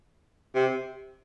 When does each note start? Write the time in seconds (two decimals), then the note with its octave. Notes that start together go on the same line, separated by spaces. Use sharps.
0.55 C3